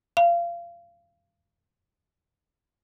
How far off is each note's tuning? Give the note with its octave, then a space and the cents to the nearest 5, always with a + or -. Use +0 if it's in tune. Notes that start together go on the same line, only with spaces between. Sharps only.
F5 -25